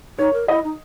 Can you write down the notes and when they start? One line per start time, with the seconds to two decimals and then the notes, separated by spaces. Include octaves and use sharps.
0.18 D#4 C#5
0.33 A#4
0.48 E4 D#5
0.64 D#4